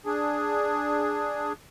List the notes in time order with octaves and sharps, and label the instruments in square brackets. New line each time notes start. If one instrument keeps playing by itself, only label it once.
[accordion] D4 G#4